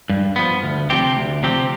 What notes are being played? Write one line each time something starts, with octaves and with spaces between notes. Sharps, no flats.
G2
F3 B3
D2
C3 F3 C4 G4
D2
C3 F3 C4 G4